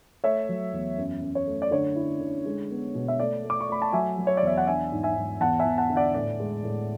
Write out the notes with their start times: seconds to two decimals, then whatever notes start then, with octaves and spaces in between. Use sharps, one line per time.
0.24 A3 C#5 E5
0.49 F#3
0.73 E2
0.98 F#2
1.22 F#2
1.35 C#5
1.47 A3
1.62 D5
1.71 D3 C#5
1.96 E4
2.20 D3
2.46 G#3
2.71 B3
2.95 B2
3.08 E5
3.20 A3 D5
3.44 A3
3.50 D6
3.61 C#6
3.69 A3 B5
3.82 A5
3.93 F#3 E5 G#5
4.18 F#3
4.27 C#5
4.37 D5
4.42 E2 E5
4.57 F#5
4.67 D4 E5 G#5
4.92 G#2
5.03 E5 G#5
5.17 G#2
5.40 E2 F#5 A5
5.59 E5 G#5
5.65 E2
5.78 F#5 A5
5.90 D3
5.96 D5 F#5
6.14 A2 D5
6.40 G#3
6.64 A2